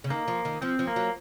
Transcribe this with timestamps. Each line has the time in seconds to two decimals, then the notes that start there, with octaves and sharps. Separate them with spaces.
0.04 C#3
0.10 D#3 A#3
0.28 F3
0.45 D#3
0.62 F3 C4
0.79 F3
0.87 A#3
0.96 F#3